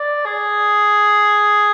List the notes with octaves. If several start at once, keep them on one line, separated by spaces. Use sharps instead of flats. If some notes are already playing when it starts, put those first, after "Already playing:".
Already playing: D5
G#4